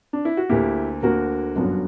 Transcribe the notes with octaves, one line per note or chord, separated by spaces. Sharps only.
D4
E4
F#4
D2 D3 A#3 E4 G4
D2 D3 A#3 F#4 A#4
G1 F#2 D3 F#3